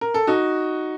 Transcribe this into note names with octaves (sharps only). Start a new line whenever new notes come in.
A#4
A4
D#4 F#4